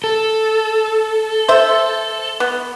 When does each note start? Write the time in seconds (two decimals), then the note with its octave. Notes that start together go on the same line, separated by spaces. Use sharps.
0.04 A4
1.49 C5 E5
2.40 B3